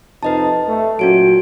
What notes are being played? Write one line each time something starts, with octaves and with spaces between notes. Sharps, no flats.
F2 C3 D#4 B4 D#5 A5
A3
A#2 F#3 C#4 F#4 D7